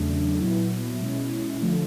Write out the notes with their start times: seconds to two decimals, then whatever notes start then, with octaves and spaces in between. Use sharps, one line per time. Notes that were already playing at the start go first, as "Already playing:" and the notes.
Already playing: E2 C#3 F#3 A3 D4
0.39 A#2 F#3 B3 E4
1.00 B2 G#3 C#4 E4
1.62 D3 F3 A3